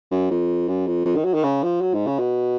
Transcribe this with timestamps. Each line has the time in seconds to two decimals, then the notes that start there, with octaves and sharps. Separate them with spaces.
0.11 F#2
0.31 F2
0.68 F#2
0.87 F2
1.06 F2
1.16 D#3
1.25 F#3
1.34 D#3
1.43 C#3
1.63 F3
1.81 F#3
1.94 G#2
2.07 C#3
2.19 B2